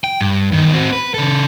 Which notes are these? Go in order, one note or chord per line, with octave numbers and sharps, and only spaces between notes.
G5
G2
E2 D#3
C4 F#4
B4
C#3 A4